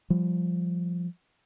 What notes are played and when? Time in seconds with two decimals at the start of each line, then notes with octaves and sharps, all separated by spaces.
0.10 F3 G3